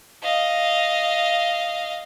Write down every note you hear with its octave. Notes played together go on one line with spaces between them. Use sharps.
D#5 F5